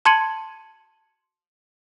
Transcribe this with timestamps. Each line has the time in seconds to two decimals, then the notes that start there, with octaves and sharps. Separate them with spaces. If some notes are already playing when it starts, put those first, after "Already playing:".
0.05 A5 C6 G#6 C#7 D#7 F#7